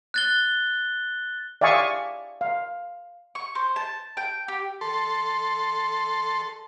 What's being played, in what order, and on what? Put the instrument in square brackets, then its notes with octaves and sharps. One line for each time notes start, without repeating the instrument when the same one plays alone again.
[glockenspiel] F#6 A6 G7
[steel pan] D5 E5 F5 G#5 C#6 D#6
F5
[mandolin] C#6
C5
A5
G5
G4
[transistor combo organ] A4 C6